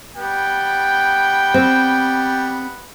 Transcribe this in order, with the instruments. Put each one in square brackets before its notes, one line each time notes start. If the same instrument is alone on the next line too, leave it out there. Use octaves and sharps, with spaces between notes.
[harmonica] G3 B3 [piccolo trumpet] G5
[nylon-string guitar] C4